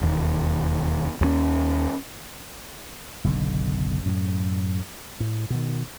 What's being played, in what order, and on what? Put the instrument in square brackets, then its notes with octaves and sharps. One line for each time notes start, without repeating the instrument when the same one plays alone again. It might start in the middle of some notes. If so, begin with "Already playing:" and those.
[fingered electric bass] E1 D#2
D#2 G#3 C#4
[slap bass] F#1 B1 B2 D3
F#2 A2
A2
B2 D#3